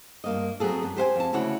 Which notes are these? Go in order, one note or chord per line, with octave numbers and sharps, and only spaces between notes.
G2 A#3 D#5
F#3 B3 C4 G#4 A4
F#2 B3
G4 C5 F5 G#5
F2 A5
D2 C#3 E4 F#4 C#5